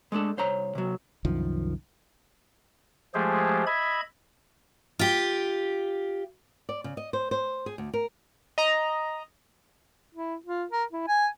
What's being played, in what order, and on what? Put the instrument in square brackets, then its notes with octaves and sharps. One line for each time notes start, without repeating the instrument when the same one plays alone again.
[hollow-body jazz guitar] G#3 A3 D4 A4
C2 C5 C#5 A#5
C3 F#3
[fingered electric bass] C2 F#2 D#3 F3
[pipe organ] F3 G#3 A3 G4 G#4 C5
D#5 E5 B5 G#6
[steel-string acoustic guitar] F4 G4
[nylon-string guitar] D5
C#3
D#5
C5
C5
G#4
D2
A#4
[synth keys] D#5 A#5
[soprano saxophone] E4
F4
A#4
E4
G#5